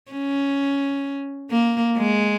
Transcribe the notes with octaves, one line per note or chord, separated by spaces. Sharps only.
C#4
A#3
G#3